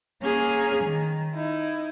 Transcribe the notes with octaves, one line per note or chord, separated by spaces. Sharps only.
A#3 C#4 G#4 G#5 F6
D#3
D#4 E4